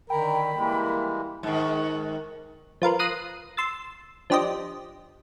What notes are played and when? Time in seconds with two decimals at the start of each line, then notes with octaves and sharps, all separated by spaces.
0.10 D3 D#3 A#4 G5 B5
0.54 E3 G3 G#3 A#3
1.43 G#2 D#3
2.82 F3 F4 A#4 B4
2.99 D#6 F#6 A#6 C7 D#7
3.57 C6 E6 A6
4.30 F3 D4 G4 C5 D#5